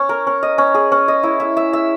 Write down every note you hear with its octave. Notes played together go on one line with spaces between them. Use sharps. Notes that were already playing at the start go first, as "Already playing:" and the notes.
Already playing: C#4
A#4
C#4
D#5
C#4
G#4
C#4
D#5
E4
E5
E5
E5